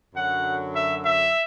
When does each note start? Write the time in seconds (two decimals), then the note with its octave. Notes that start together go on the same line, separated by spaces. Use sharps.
0.14 F#2 D3 F#3 F#5
0.74 E5
1.04 E5